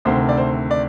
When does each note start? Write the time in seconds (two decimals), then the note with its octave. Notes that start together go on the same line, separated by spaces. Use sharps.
0.05 D2 C3 D#3 A3 C4 C5
0.29 D5
0.37 C5
0.71 D5